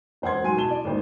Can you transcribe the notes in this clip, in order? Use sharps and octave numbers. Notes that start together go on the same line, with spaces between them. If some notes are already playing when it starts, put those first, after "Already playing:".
E1 C5 F#5 C6 G#6
G#2 F#3 G#5 C6 D#7
B2 E4 A5 E7 G7
D5
G#1 D#2 C5